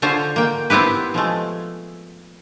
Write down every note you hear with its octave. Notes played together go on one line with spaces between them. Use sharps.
D3 F4 C5 C#5
A#3 G5
B3 C4 E4 G4 B4
F3 G#3 A3